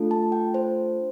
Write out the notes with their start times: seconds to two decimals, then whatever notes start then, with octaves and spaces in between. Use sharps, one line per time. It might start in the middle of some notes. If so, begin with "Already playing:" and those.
Already playing: A3 D4 F4 A4
0.11 A5
0.32 G5
0.54 C5